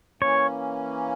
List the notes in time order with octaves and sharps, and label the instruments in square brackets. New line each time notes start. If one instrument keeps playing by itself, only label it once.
[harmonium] E3 A#3 C#4 [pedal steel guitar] C#5